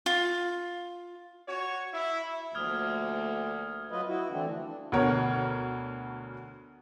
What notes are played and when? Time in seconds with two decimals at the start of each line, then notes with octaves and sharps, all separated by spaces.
0.06 F4
1.48 F#4 C#5
1.93 E4
2.55 D2 F3 A3 A#3 D#6 F6 G#6
3.90 F#3 F4 B4 D#5
4.08 E4 F#4
4.31 D3 E3 A3 C4 D4
4.48 F3
4.66 D4
4.92 D2 B2 A#4 C#5